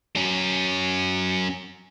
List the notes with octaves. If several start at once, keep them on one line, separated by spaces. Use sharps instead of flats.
F#3 C#4